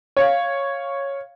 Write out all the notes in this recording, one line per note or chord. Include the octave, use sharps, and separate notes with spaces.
C#5 F5